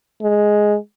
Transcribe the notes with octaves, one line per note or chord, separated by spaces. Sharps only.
G#3